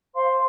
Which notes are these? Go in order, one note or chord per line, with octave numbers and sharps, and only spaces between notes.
C5 F5 C6